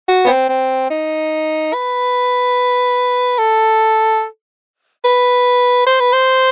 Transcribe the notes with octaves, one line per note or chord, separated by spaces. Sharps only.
F#4
B3
C4
C4
D#4
B4
A4
B4
C5
B4
C5